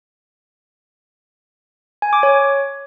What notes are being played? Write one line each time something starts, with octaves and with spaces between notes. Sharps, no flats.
G#5
D6
C#5